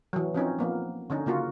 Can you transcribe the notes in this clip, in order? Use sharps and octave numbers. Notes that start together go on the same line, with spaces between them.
E3 F#3
F3 C4 C#4 D#4
F3 A#3 B3
D3 C#4 D#4
C#3 A#3 F4 F#4